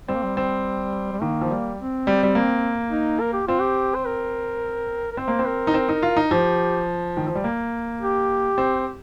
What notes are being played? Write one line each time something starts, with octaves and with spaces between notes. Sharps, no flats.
G3 C4
A#3
G3
C4
G3
D#3 A#3
F3
G3
C4
G3
G3
A#3
D#4
A#4
G4
C4 F4
G4
C5
A#4
A#4
C4 C5
A#3
C4
A#4
D#4
C4
D#4
F4
D#4
F3 G4
D#3
F3
G3
A#3
G4
C4